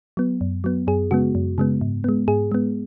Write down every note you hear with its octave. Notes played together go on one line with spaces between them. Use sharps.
F#3 B3
F#2
F#3 B3
F#2 G#4
C#3 G#3 B3 F#4
F#2
C#3 G#3 B3
G#2
G#3 B3
G#2 G#4
G#3 B3